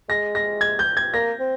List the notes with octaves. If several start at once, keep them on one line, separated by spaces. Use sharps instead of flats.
G#3 A#6
A#6
G#6
G6
G#6
A#3 A#6
C4